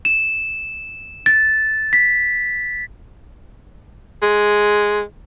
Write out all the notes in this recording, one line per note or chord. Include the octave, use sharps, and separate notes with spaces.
E7
A6
B6
G#3